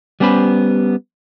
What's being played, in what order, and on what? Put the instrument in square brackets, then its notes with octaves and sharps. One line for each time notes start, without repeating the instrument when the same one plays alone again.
[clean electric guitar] G3 B3 C#4 G4 C5 B5